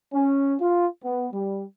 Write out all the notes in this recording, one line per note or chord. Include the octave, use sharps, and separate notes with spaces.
C#4
F4
B3
G3